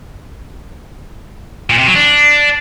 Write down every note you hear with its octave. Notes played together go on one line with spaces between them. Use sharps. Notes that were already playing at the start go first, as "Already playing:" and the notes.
A#2
C3
F#3
D4